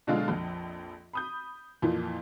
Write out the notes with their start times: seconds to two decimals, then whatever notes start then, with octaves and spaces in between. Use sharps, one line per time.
0.07 B2 D3 F#3 G#3 D4 F4
0.28 A#1 F2
1.13 B5 D#6 G6
1.82 F2 A#2 E3 F3